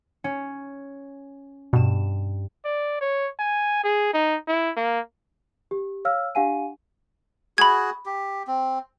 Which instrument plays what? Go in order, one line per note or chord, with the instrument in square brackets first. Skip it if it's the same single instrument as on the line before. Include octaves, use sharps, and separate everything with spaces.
[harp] C#4
[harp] G2 E7 [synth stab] B2
[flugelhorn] D5
C#5
G#5
G#4
D#4
E4
A#3
[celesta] G4
C#5 F5 E6 F6
D4 G4 F5 F#5 G#5 D#7
[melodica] F#4 G#4 [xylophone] B5 G#6
[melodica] G4
C4